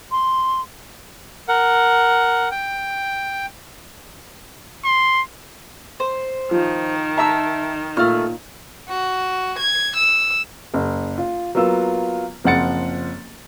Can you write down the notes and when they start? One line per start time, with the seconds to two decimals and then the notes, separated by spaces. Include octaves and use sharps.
0.11 C6
1.49 A#4 F#5
2.51 G5
4.85 C6
6.00 C5
6.51 D#3 F3
7.17 E5 A5 A#5 E6
7.97 A#2 A3 F6
8.89 F#4
9.59 G#6
9.97 E6
10.74 F#1
11.18 F4
11.55 F#3 A#3 B3 F4 E6
12.44 F#1 F3 C4 F#5 A6 C#7